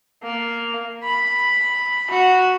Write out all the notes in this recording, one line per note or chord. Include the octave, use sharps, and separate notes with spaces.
A#3
B5
F#4